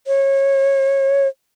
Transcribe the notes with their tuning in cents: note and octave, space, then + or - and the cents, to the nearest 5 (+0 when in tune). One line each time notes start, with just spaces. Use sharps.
C#5 -25